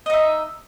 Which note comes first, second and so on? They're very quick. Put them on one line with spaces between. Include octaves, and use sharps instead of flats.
D#5 D#4 E5